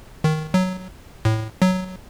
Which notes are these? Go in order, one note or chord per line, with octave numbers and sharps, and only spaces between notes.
D#3
F#3
A2
F#3